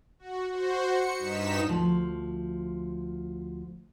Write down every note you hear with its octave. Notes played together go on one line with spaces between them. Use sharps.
F#4
F#4 C5
C#7
G2 D#4 B6 E7
D2 F3